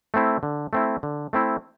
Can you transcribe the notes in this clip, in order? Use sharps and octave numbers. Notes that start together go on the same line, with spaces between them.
A3 C4 E4
D3
A3 C4 E4
D3
A3 C4 E4